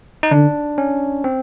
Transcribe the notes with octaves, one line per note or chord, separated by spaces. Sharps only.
D#4
D3 D4
C#4
C4